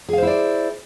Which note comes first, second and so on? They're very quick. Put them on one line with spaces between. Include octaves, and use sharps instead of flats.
G#4 F5 C5 E4 D5